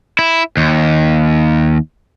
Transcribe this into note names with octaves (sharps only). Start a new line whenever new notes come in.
E4
D#2